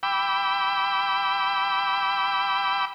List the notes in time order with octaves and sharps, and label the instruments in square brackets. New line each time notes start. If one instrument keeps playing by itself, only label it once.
[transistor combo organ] G5 B5 D6 E6